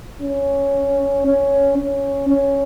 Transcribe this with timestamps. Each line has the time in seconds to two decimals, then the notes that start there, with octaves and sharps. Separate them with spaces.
0.22 C#4
1.26 C#4
1.78 C#4
2.29 C#4